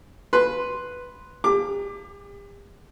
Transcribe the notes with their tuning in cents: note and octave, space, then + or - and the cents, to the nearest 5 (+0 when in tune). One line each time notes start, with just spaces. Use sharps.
B4 +0 C6 +0
G4 +45 D6 +15